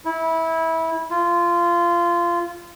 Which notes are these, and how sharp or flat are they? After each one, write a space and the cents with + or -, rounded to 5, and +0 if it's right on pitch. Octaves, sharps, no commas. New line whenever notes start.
E4 -20
F4 -20